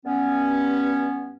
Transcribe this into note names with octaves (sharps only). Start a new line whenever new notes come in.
G2 B3 C#4